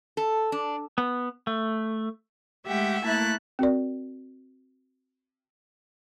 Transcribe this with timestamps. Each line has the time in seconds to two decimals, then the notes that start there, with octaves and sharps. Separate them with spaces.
0.17 A4
0.52 D4
0.98 B3
1.47 A3
2.66 G#3 A3 G4 E5 F#5 G5
3.05 A3 A#3 E4 A5 F#6
3.59 C4 F#4 A#4 D5